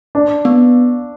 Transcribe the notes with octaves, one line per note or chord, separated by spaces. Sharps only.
D4
B3